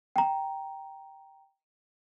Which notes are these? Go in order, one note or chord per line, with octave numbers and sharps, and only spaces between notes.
G5 A#5